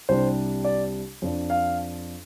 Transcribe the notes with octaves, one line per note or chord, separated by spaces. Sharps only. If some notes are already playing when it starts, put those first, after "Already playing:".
C2 C3 G3 D4 C5
D5
F2 F3 D4
F5